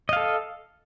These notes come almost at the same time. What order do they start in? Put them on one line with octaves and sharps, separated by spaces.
D#5 F5 A4